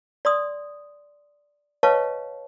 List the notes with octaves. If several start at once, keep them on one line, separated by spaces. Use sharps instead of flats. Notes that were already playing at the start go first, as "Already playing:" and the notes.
D5 C6 D#6
B4 C#5 D#5 F5 A5 C#6